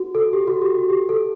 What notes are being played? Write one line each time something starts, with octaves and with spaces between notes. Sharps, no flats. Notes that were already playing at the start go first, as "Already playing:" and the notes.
Already playing: F#4
A4
G4
F#4
G4
F#4
G4
A4